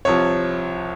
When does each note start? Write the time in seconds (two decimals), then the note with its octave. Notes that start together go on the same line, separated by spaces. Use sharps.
0.05 C2 C3 F3 C#5